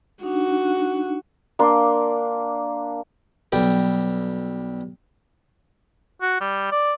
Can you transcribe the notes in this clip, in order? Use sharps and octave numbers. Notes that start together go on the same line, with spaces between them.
D4 D#4 F#4
A#3 D4 C6
B1 G3 G5
F#4
G3
D5